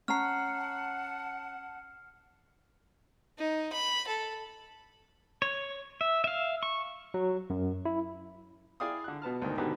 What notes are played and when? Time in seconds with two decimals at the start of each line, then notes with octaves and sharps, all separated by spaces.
0.08 C#4 F#5 A5 A#5 F6 C7
3.38 D#4
3.72 B5
4.07 A4
5.42 C#5
6.01 E5
6.24 E5 F5
6.63 C#6
7.14 F#3
7.50 F#2
7.85 E4
8.80 E4 G#4 D5 F5 G5 D#6
9.04 D3 F#6
9.22 B2 B3 A5 F6
9.42 D2 G#2 B2 D3 D#3
9.58 G#2 B2 D3 D#3 G4 B4